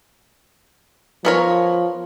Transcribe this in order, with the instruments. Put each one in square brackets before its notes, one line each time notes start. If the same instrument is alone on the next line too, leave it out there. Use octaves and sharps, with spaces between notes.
[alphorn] F3 [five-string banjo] B3 A#4 C#5